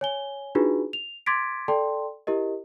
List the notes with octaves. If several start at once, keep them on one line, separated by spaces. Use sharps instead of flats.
C#5 G#5 G7
D4 D#4 F4 F#4 G#4 B4
F7
C6 D6 G#6 A6 B6 D7
A4 D5 G5 A5 C6
E4 G4 A#4 D#5